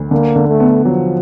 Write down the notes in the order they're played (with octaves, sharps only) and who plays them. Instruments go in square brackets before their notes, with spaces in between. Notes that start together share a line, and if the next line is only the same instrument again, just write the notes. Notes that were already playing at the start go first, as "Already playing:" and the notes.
Already playing: [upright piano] D2
[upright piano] D3 [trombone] A#3
[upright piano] D3
[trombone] A3
[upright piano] B3
[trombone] F3 [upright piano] F#3